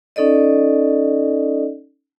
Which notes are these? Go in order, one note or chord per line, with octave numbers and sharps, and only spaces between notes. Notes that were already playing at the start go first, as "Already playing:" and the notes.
C#4 D#4 A4 D5 D#5